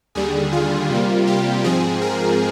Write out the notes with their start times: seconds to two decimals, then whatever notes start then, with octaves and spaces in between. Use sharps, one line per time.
0.15 D#2 D3 G3 G#4
0.52 F4
0.90 C3 G3 A#3
1.27 G4
1.64 G#2 F3 C4 G#4
2.01 A#4